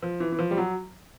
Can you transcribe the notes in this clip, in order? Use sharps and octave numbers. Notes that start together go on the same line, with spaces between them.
F3
E3
E3
F3
G3
F#3